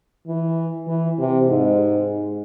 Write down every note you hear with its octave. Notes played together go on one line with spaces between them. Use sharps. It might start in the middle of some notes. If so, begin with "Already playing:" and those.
E3
E3
C3
G#2